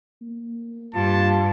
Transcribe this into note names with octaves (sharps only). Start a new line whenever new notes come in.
A#3
G2 F4 A5